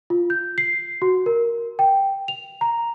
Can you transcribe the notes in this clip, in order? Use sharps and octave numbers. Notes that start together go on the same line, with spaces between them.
F4
G6
C7
F#4
A#4
G5
F7
A#5